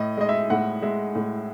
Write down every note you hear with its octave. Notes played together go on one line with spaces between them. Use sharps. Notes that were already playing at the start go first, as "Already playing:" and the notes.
Already playing: A2 D#5
G#3 D#5
E5
A2 F#5
G#3 E5
A2